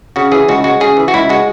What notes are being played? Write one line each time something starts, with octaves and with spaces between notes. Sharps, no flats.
C#3 F#4
E3 G#4
C#2 F#4
G#3 F#4
C#3 G#4
E3
F#4
C#2 E4
G#3 F#4